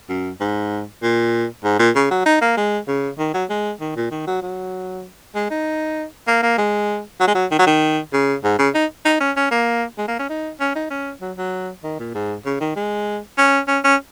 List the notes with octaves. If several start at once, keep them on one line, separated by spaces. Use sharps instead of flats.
F#2
G#2
A#2
G#2
A#2
C#3
F#3
D#4
A#3
G#3
C#3
D#3
F#3
G#3
D#3
A#2
D#3
F#3
F#3
G#3
D#4
A#3
A#3
G#3
F#3
G#3
F#3
D#3
F#3
D#3
C#3
G#2
C#3
D#4
D#4
C#4
C#4
A#3
G#3
A#3
C#4
D#4
C#4
D#4
C#4
F#3
F#3
D#3
A#2
G#2
C#3
D#3
G#3
C#4
C#4
C#4